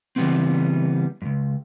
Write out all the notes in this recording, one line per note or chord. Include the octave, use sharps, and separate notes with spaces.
C#3 E3 G3 G#3 B3 C4
C#2 F#2